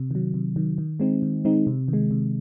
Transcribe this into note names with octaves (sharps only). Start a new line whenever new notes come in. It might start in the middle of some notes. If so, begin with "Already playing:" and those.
Already playing: C3
D#3 F#3
C3
D#3 F#3
D#3
G#3 C4 D#4
D#3
G#3 C4 D#4
C3
D#3
G#3
C3